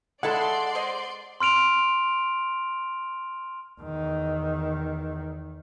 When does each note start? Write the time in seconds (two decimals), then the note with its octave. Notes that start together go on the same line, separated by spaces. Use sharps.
0.23 G#3 E4 A4 D5 F#5 A5 B5 C6
0.75 C5 D#5
1.40 C6 F6 D7 F7
3.81 E2 D#3